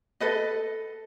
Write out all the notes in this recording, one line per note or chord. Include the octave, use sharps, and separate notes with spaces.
A4 B4 D#5